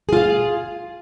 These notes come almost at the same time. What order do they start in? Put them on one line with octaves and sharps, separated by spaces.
G#4 F4 F5